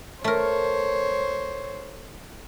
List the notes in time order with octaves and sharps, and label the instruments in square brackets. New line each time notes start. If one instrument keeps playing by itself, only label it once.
[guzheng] A3 A#4 [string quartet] C5 C#5